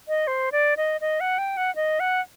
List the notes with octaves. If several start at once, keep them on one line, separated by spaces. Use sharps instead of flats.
D#5
C5
D5
D#5
D#5
F#5
G5
F#5
D#5
F#5